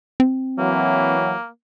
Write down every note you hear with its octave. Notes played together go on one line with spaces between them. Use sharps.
C4
E3 F#3 A#3